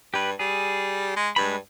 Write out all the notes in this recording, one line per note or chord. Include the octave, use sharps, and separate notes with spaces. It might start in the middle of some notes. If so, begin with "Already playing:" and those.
G2 G4 B4
G3 G#4
G#3
G2 G#3 B5